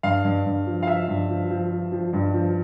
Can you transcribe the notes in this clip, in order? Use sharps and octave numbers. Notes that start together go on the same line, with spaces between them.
G2 F5
G2
G2
F3
F5
F3 E5
G2
F3
F3
F3
F3
G2
F3